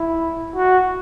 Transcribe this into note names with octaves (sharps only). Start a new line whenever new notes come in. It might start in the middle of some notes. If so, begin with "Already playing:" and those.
Already playing: E4
F#4